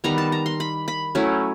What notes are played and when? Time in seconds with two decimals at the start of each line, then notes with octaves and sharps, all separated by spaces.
0.04 D#3 G3 B3 A#5
0.18 A5
0.32 A#5
0.46 C6
0.60 B5
0.88 B5
1.15 F#3 A3 C#4 E4